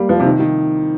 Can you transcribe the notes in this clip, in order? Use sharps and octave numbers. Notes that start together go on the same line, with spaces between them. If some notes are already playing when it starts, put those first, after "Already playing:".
Already playing: G3 A#3
F3
C3
D#3
D#3